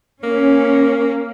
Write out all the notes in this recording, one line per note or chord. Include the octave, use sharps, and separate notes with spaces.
A#3 C#4